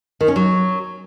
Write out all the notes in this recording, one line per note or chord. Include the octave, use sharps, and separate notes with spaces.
D#3
C#4
F#3